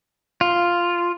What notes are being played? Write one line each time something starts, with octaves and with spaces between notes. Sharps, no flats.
F4